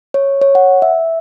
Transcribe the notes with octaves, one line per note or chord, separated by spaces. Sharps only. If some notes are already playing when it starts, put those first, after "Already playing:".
C#5
C#5
F#5
E5